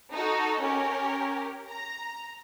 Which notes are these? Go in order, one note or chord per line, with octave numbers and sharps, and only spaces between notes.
D#4 F#4 A4
C#4 G4 A#4
A#5